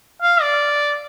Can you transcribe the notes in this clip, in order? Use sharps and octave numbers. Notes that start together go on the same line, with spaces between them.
F5
D5